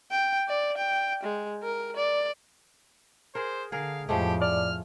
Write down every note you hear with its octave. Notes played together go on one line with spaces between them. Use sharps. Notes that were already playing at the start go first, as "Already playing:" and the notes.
G5
D5
G5
G#3
A#4
D5
G#4 A#4 C5
D3 G#4 A#4 F5
F2 A2 F3 G#3 A3 G4
D5 F6